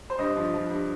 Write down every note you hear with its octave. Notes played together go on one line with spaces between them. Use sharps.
C5
G2 D#5
F3
F3
G2